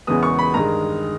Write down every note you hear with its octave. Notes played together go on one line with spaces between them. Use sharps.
E2 C#3 E3 G#3 B3 D#6
C#6
B5
G2 D#3 G#3 A#5